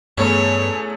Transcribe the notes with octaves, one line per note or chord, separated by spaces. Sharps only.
E2 G2 A3 B3 C#4 G#4 C#5